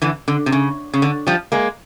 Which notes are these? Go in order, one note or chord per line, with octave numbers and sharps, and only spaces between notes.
D3 E3
D3
C3
C#3
C#3
D3
F3 G3
G#3 A#3